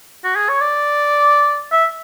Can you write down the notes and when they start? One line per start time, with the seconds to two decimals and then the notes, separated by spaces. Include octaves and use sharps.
0.24 F#4
0.36 G#4
0.49 C#5
0.61 D5
1.72 E5